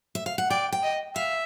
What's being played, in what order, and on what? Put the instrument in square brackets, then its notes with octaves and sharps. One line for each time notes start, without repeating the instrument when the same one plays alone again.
[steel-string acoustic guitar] E5
F5
F#5
[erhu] D5 [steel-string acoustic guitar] G5
[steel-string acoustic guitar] G5
[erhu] D#5
[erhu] E5 [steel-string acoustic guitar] F5